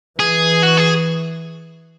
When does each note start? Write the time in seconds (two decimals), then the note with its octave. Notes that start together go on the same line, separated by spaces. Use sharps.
0.19 E3 G#4
0.63 F#4
0.78 G#4